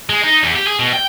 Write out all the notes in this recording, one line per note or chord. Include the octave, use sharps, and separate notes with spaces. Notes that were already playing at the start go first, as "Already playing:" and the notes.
G#3
D#4
E2
G4
G#4
B2
G5